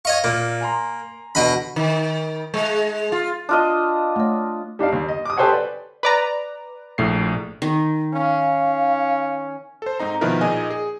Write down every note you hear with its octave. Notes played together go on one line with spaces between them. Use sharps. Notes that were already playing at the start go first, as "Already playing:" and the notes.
C#5 D#5 F5 C#6
A#2 A#3
G#5 A#5 C6
E2 B2 D3 D#5 B5
D#3
G#3
F4
D4 F4 D#5
A3 C#5
G3 D4 D#4 F5
D#2
D#5
D6 D#6
G4 A4 C5 C#5 F#5 G#5
B4 D5
B4 D5 A#5
A#1 A2 C7
D#3
C#4 F5
A4 C5
G#2 C4 D#4 A#5
B2 D#3 F3 E4 A#4 B4
A#2 D#4 G#4 D#5 G#5
G#4